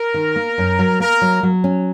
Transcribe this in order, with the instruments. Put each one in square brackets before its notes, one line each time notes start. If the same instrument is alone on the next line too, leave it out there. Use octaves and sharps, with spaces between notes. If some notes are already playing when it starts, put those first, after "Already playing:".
Already playing: [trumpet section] A#4
[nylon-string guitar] D#3
A#3
F#2
F#3
[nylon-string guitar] A#3 [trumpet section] A#4
[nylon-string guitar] F#3
F#3
C#4